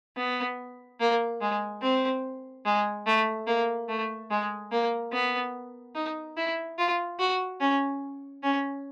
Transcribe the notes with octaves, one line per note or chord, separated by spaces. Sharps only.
B3
A#3
G#3
C4
G#3
A3
A#3
A3
G#3
A#3
B3
D#4
E4
F4
F#4
C#4
C#4